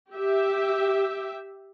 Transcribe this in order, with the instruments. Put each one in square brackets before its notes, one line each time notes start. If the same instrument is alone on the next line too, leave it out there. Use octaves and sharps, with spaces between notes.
[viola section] G4 E5